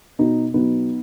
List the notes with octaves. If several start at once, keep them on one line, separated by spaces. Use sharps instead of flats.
B2 B3 D#4
F#3 B3 D#4